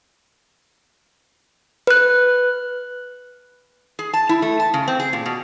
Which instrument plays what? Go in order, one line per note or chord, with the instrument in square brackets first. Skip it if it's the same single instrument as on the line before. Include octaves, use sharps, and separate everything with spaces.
[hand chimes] B4 F#6
[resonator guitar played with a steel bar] G#4
A5
E4
A3
A5
C#3
C4
G#4
A#2
B2